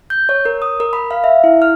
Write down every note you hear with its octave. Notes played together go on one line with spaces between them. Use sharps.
G6
C#5
A#4
D#6
A#4
B5
F5
E5
E4
F6